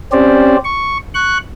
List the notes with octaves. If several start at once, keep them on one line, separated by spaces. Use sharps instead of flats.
C4 C#4 G4 C5 D5
C#6
C#6 F#6